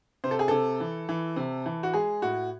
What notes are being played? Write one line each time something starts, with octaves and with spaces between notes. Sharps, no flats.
C3 C5
A4
G#4
C3 A4
E3
E3
C3
E3
F#4
G#3 G#4
A2 F#4